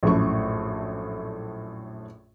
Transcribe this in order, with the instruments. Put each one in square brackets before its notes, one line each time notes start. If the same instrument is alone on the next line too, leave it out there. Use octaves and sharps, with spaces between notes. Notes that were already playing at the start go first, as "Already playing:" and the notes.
[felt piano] A#1 F#2 A2 A4 C#6